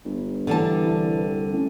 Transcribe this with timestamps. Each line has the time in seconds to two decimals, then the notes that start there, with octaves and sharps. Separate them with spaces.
0.05 G1
0.47 D3 E3 G3 A5
0.83 C2
1.53 A2 C#4